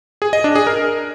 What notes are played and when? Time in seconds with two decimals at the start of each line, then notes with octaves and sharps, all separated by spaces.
0.22 G#4
0.33 D#5
0.44 D4
0.55 G#4
0.67 A#4